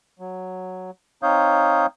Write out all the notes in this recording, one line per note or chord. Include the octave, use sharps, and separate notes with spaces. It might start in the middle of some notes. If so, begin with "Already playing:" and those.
F#3
C4 D#4 C#5 F5 D#6 G6